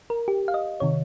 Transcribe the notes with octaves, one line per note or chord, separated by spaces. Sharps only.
A#4
G4
F5
D#5
C3 D#3 C#5